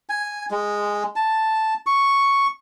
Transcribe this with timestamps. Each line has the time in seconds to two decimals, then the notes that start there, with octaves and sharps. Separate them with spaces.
0.09 G#5
0.51 G#3
1.16 A5
1.87 C#6